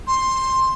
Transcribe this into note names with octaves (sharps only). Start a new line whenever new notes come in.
C6